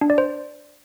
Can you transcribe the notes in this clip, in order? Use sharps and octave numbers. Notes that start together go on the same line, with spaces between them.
D4
D5
C5